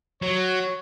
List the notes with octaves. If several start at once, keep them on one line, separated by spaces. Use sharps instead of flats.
F#3 C#5